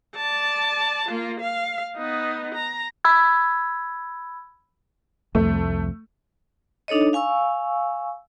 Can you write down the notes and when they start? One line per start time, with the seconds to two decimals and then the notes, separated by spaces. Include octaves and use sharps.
0.16 D5 A5
1.09 A#3 F4
1.40 F5
1.97 B3 D#4
2.55 A#5
3.04 B5 E6 G#6
5.35 C2 F2 A3
6.88 D4 D#4 A4 C#5 D#5
7.13 F5 G#5 C#6 E6